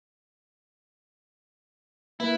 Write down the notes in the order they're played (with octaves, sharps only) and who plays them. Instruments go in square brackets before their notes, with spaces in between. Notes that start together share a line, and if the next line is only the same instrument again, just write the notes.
[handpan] A#3 B4 [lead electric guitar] E4